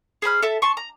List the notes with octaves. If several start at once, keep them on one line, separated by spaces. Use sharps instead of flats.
G#4 C5 B5 F6
A4 E5 A5
A5 C6 C#6
A#5